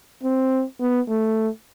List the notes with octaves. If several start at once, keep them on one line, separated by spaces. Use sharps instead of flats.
C4
B3
A3